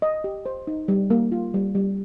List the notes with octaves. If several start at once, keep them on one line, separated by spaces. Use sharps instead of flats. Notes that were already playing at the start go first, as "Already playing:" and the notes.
D#5
G4
C5
D#4
G3
A#3
F4
G3
G3